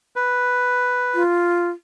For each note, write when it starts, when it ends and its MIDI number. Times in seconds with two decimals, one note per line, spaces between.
0.16 1.23 71
1.15 1.69 65